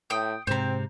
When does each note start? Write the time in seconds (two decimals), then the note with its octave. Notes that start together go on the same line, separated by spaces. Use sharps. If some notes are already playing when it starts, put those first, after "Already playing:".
0.10 A2 G5 D#6 G6
0.47 G#2 C3 C4 C5 A#5